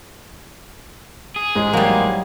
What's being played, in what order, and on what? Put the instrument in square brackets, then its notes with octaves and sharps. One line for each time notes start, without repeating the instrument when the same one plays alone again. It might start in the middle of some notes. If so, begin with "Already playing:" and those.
[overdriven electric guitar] G#4
[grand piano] A1 G#2 G#3
[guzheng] F#3 G3 [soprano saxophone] A#3